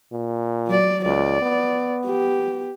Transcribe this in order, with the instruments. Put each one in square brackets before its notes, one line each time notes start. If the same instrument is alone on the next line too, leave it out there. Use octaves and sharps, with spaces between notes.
[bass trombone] A#2
[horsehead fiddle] F#3 D5
[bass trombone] C#2 [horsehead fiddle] D5
[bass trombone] B3
[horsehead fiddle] G4